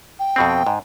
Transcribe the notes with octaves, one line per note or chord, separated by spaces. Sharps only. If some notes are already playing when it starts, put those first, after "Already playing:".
G5
F2 B2 C4
G#2